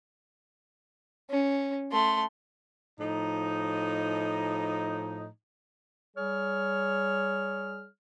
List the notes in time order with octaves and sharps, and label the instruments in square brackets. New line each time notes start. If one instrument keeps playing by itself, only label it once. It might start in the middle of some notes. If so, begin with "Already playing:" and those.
[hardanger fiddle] C#4
A3 C6
[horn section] A2 F3 D#4
[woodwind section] G3 G#4 C#5 F6